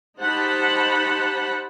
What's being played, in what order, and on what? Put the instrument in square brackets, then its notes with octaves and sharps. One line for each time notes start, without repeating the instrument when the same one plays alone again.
[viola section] D#4 G4 C5 F#5 A5 B5